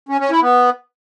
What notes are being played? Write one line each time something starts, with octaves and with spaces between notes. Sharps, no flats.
C#4
C#4
E4
B3